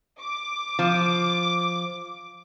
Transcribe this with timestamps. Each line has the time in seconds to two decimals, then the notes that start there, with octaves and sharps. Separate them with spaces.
0.20 D6
0.79 F3